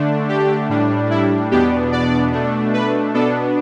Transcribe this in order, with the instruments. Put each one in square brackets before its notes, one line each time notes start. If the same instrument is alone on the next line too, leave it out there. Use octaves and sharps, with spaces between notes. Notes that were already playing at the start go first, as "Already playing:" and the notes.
Already playing: [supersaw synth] D3 A3 D4
G4
A2 G3 D4
E4
E2 B2 B3 D4 G4
D5
B2 A3 D4
B4
B2 B3 D4 A4